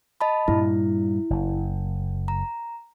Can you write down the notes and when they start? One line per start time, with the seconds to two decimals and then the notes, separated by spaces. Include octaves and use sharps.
0.21 D#5 A5 B5
0.48 G2 A#2 G3 E4
1.30 F#1
2.28 A#5